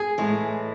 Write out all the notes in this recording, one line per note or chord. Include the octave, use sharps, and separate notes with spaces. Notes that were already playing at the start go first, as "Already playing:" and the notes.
Already playing: G#4
A2 E3 G#3